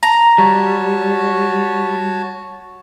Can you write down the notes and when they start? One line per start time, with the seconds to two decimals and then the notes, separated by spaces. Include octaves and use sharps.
0.03 A#5
0.38 G3 F#4 C#5 A5